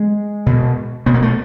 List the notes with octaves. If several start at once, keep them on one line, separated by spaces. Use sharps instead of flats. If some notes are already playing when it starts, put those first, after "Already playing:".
Already playing: G#3
B2
B2 B3
A#3
A3